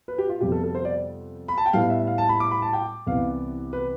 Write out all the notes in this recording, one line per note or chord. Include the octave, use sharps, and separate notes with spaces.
B4
G4
F4
F2 C3 G3 B3 G4
A4
A4
C5
D5
B5
A5
G5
A2 G3 B3 F5
E5
F5
A5
B5
D6
B5
A5
G5
C2 C3 E3 B3 F5
B4